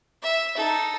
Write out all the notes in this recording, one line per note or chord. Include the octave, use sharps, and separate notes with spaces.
E5
D#4 A4